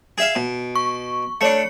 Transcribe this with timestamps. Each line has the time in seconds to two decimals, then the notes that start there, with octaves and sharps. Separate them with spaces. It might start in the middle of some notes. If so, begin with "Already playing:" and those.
0.18 G#4 E5 F5
0.35 B2
0.75 C#6
1.41 A3 D4 C#5 C#7